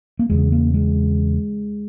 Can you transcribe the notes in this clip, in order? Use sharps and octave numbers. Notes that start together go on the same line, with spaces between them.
A#3
E2 C#3 G#3
A#3
G#3